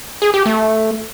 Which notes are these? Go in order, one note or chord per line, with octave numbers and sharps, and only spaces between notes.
G#4
G4
A3